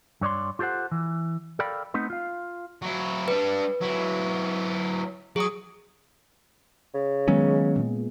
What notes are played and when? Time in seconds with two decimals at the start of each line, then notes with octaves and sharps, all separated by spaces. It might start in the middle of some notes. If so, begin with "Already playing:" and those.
0.21 G2 C#5 D5 C6
0.59 F4 G4 A4 C5 F#5
0.91 E3
1.59 A4 A#4 D5 F5 G5 B5
1.94 A3 B3 C4 D#4 B4
2.10 F4 F5
2.82 F#3 E4
3.28 G3 D4 B4
3.81 F#3 E4
5.36 F#3 G#4 D#6
6.95 C#3
7.28 D#3 F#3 G#3 B3 C#4 G#4
7.76 A#2